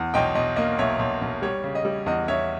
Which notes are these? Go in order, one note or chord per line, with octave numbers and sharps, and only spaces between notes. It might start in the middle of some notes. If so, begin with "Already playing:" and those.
Already playing: E2
B1 D#5 G5
B1 D#5
A#3 D#5
B1 C#5 E5
B1
B1
G3 C#5
C#3
D#5
G3
E2 D#5
E2 C#5 E5